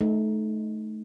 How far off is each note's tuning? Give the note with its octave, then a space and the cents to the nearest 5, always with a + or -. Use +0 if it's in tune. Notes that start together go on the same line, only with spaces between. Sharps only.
A3 -25 D#4 +0